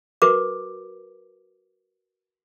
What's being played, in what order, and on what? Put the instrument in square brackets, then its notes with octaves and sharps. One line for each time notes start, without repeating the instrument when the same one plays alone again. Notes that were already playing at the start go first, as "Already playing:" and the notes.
[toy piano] F#4 A#4 B4 D6